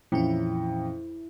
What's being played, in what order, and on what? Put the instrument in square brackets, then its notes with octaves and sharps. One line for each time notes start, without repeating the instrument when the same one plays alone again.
[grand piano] F2 [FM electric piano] A#2 E3 C#4 [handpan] E4